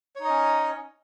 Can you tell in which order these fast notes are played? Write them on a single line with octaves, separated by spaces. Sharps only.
C#5 D#4 D#5 C#4